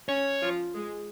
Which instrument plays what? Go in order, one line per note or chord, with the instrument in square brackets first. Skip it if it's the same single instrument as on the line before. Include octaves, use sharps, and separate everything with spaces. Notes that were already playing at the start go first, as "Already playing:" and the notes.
[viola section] C#4 [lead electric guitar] C#5
[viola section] F3 F4
G#3 G#4